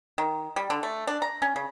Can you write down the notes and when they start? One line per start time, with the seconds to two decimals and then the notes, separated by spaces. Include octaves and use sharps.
0.18 D#3
0.56 G3
0.70 D3
0.83 A3
1.07 D4
1.22 A#5
1.42 C#4
1.56 C#3